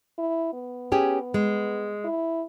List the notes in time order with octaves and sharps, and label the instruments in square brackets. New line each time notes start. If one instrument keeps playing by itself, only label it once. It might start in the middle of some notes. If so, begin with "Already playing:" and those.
[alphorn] E4
B3
[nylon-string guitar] C#4 G4 G#4
G#3
[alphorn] E4